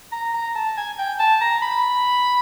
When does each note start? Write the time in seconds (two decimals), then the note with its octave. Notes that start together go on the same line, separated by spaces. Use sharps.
0.12 A#5
0.34 A#5
0.55 A5
0.77 G#5
0.99 G5
1.19 A5
1.41 A#5
1.62 B5